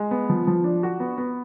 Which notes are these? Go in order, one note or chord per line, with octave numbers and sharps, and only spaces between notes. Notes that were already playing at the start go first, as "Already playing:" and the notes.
Already playing: G#3
B3
F3
F3
D4
F#4
B3
B3